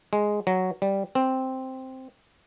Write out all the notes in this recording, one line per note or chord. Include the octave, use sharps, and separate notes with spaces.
G#3
F#3
G3
C4